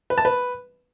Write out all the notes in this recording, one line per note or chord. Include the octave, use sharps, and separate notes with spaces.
B4
A5
B4